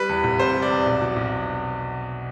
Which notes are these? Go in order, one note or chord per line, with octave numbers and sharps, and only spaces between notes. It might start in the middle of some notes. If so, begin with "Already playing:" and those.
Already playing: G3 B4
E2
F1
C3 C5
G3
D5
E2
B1
B2
B1